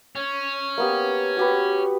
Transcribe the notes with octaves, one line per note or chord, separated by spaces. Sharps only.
C#4
A#3 B3 G4
F#4 G4 B4